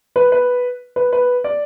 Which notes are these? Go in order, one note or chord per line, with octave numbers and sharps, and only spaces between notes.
B4
B4
B4
B4
D5